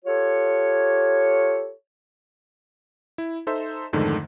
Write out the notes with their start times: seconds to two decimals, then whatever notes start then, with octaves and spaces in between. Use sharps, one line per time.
0.05 F4 G4 A4 C#5
3.18 E4
3.47 D#4 A4 C5 E5
3.93 F2 G#2 D3 D#3 A3